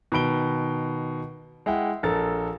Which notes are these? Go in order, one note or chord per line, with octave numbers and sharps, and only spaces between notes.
B2 D#3 B5 D7 G7
G#3 E4 F#5 G5
A#1 A4 A#4 A6